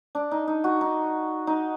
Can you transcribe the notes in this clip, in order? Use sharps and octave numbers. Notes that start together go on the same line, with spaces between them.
D4
D#4
D#4
F#4
D#4
D#4